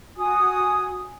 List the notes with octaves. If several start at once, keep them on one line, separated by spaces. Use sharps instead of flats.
F#4 G#5 D#6